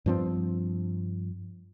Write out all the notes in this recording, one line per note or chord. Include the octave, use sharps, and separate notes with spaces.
G2 F3 C4